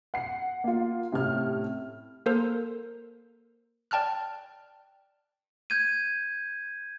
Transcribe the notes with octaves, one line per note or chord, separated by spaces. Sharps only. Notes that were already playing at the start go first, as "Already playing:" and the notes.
F#5 C7
A#3 F4
A2 C3 C#4 F6
A#3 A4 A#4 C5
D5 G5 A5 F6 F#6
G6 G#6 D#7